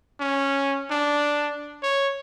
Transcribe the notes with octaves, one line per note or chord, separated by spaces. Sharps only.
C#4
D4
C#5